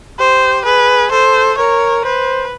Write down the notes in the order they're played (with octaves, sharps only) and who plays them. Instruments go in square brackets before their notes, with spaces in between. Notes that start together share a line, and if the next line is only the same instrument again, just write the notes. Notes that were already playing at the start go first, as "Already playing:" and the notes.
[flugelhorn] G4 [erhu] C5
[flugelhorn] G#4 [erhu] B4
[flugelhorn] A4 [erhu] C5
[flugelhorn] A#4 [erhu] C#5
[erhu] B4 [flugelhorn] C5